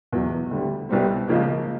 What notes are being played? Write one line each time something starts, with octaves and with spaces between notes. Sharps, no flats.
E2 B2 F#3
D2 D3 G3
C2 B2 G3 C4
C#2 C#3 F3 A#3